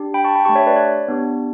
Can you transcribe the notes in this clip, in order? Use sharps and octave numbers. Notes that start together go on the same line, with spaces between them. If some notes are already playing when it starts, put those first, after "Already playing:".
Already playing: D4 G4
G5 B5
A5 C#6
G5 B5
A3 D4 G4 A5 C#6
C#5 E5
B4 D5
C#5
B3 D4 G4